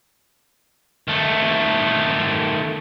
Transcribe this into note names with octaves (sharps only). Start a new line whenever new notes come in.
D#3 A3